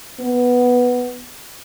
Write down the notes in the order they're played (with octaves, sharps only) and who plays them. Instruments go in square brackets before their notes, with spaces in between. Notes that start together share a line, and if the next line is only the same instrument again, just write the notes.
[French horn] B3